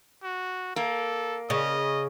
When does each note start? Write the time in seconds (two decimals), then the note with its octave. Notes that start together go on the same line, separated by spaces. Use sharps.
0.23 F#4
0.76 A#3 A4
1.50 C#3 D#5